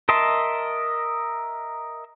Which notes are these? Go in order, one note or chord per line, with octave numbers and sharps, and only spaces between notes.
A#4 D#5 E5 A5 C6